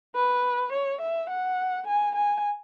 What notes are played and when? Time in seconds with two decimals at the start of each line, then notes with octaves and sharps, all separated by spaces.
0.15 B4
0.72 C#5
1.01 E5
1.30 F#5
1.87 G#5
2.15 G#5